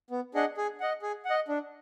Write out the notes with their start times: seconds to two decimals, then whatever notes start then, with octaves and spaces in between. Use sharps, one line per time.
0.10 B3
0.34 D4 G#4 D#5 F#5
0.57 G#4
0.80 D#5 F#5
1.02 G#4
1.25 F#5
1.30 D#5
1.48 D4